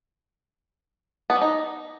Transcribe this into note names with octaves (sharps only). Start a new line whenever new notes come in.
B3
G3
D#4